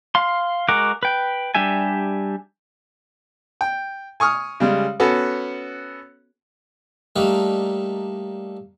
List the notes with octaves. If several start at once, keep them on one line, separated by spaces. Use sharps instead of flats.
F5 C6
G#3 F#4 A#4 F#5 D6
B4 G5
G3 D4 G4 E5 G#5
G5
G#5 C#6 D#6 F6
C#3 G3 G#3
B3 C#4 F#4 A4
G3 A3 A#3 D4 D#4